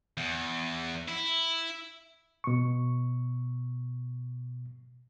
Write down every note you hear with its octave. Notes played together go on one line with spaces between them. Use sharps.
E2
E4
B2 C#6